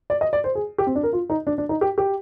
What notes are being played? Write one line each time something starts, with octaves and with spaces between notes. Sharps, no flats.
D5
D#5
D5
C5
G#4
G4
C4
D4
A#4
F4
D#4
D4
D4
D#4
G4
G4